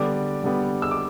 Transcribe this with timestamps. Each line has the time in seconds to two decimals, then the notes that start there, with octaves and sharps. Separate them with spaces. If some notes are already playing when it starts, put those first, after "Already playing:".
Already playing: D3 G3 B3 D5 D6
0.44 D3 G3 B3
0.82 E6
0.91 D6